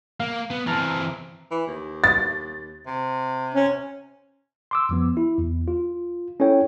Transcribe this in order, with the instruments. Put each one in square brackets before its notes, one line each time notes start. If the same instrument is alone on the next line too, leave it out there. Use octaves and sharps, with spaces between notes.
[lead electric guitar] A#3 [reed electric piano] F5
[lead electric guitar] B3
[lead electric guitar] E3 C4 [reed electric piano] A5 A#5 F6
[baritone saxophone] E3
D#2
[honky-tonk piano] A6
[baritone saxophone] C3
[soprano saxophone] C#4
[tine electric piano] C6 D6 E6
F2 F3 B3
E4
E2
F4
C#4 E4 A4 C#5 G5